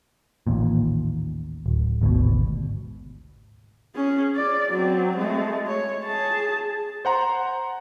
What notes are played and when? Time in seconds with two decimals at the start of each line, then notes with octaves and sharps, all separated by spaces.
0.47 A1 D#2 A#2
1.66 D1
2.01 G#1 D2 G#2 B2
3.95 C#4 G#4
4.36 D5
4.70 F#3 C4
5.16 G#3 A3
5.67 C#5
6.05 G#4 A5
7.05 C5 F#5 A#5 C6